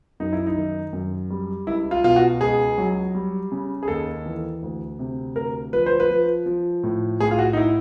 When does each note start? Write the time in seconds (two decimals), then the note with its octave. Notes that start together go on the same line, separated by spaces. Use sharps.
0.20 F#2 D#4
0.33 E4
0.46 D#4
0.56 D#3
0.93 F#2
1.30 G3
1.67 C#2 E4
1.91 F4
2.04 B2 F4
2.16 F#4
2.41 C#2 G#4
2.78 F#3
3.15 G3
3.52 C#3
3.83 G#4
3.88 D#2 A4
4.26 E3
4.62 D2
4.99 C3
5.36 D2 A#4
5.73 F3 B4
5.86 C5
6.00 B4
6.09 F3
6.46 F3
6.83 A2
7.20 A2 G#4
7.31 F4
7.39 F#4
7.53 D#4
7.57 E4